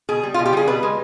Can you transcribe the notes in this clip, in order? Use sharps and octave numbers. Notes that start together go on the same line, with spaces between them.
B2 G#4
G3
B2 F4
G4
G3 G#4
B2 B4
G#3